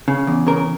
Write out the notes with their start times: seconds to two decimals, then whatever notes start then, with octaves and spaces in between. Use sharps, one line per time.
0.08 C#3
0.27 E2
0.47 C#3 A#4